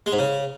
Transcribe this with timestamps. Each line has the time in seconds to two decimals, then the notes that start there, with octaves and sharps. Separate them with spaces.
0.06 G#3
0.13 G#2
0.19 C#3